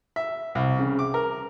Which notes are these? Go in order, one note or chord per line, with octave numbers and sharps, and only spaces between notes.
E5
C2
C#3
D6
A#4